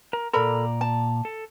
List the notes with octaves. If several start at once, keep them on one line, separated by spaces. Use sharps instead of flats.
A#4
A#2 A4 A#4 D5 A#5 B5
A5
A4